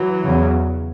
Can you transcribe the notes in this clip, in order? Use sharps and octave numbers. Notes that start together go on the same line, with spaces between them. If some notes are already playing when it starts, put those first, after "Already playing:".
Already playing: E3 F#3
E2 C#3